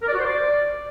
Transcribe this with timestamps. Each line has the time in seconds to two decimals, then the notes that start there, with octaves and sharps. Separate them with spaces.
0.02 A#4
0.08 D5
0.13 F#4
0.19 C5
0.25 D5